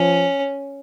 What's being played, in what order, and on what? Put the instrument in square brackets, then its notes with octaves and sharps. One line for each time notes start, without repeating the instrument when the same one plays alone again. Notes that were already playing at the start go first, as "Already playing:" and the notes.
Already playing: [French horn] F3 [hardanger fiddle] C#4